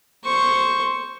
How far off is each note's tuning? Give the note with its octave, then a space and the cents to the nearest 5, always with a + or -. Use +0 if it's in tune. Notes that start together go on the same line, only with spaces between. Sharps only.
C5 +0 C#6 +0